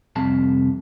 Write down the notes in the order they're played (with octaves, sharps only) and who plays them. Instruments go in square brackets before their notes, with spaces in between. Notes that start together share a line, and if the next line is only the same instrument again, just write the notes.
[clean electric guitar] C2 F2 C3 A5